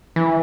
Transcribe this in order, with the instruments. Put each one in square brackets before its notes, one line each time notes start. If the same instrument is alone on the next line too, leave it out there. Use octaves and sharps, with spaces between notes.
[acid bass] E3